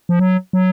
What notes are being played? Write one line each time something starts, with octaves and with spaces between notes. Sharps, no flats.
F3
F#3
F#3